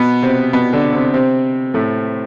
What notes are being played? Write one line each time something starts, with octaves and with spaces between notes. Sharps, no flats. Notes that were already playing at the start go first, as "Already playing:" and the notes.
Already playing: B2 B3
C3 C4
B2 B3
D3 D4
C3 C4
C3 C4
A2 A3